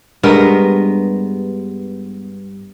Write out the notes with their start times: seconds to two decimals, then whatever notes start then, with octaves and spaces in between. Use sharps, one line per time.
0.23 G2 G#3 B3 A#4